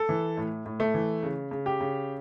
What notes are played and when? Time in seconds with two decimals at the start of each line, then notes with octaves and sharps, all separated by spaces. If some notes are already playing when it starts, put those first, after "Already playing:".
Already playing: A4
0.09 E3
0.37 A2
0.66 A2
0.80 A3
0.94 E3
1.23 C#3
1.51 C#3
1.66 G4
1.81 C#3